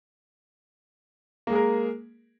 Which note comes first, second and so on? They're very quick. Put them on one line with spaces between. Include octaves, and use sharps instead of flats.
A#3 G#3 G#4 A#4